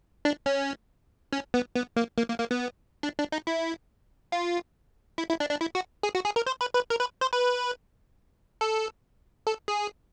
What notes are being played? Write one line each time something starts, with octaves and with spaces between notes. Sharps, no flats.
D4
C#4
C#4
B3
B3
A#3
A#3
A#3
A#3
B3
D4
D4
D#4
E4
F4
E4
E4
D4
D4
E4
F#4
G#4
F#4
G#4
A#4
C5
B4
B4
A#4
B4
C5
B4
A4
A4
G#4